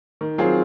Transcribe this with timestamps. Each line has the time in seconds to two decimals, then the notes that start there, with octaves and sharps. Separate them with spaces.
0.21 D#3
0.38 F#3 C4 F4 G#4